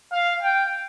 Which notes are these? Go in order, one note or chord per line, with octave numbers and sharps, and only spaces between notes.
F5
G5